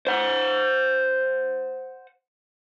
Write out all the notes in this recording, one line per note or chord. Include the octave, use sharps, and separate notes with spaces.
C5 F#5